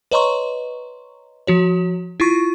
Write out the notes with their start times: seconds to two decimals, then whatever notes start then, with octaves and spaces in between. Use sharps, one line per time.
0.11 B4 C#5 D#5 A#5 C6 C#6
1.47 F3 F#4 C#5
2.20 E4 F4 C#6